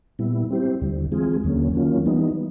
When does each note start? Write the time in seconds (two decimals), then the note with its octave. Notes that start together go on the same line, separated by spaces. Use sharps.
0.19 A#2 G3 B3 E4
0.50 G3 C4 E4 G4 C5
0.81 D#2 D3 G3
1.12 E3 G#3 C4 F4 G#4
1.44 D#2 D3 F#3 A#3 C#4
1.75 D#3 F#3 A#3 C#4 F4
2.06 E3 G3 B3 D#4